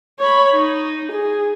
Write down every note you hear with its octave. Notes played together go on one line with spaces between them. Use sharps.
C#5 B5
D#4
G#4